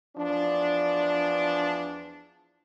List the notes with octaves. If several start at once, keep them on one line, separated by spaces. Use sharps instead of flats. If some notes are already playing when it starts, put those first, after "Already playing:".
E2 F3 D4